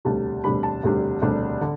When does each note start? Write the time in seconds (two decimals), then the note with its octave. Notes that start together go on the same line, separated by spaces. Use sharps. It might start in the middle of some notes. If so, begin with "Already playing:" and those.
0.05 E1 D2 C3 G3 D4 A5
0.44 E1 D2 C3 G3 D4 B5
0.63 A5
0.83 E1 D2 C3 G3 D4
1.22 E1 D2 C3 G3 D4
1.61 D3